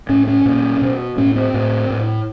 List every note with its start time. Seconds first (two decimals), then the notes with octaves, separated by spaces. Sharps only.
0.09 A2 C#4
0.27 C#4
0.46 A#2
0.82 B2
1.17 A2 C#4
1.36 C4
1.54 A2
1.90 A2